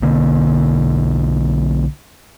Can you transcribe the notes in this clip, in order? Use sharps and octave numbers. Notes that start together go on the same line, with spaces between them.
B1 B2 D3 A#3